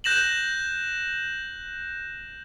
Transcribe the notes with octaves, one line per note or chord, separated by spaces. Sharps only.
F#6 G6 A#6 E7 F#7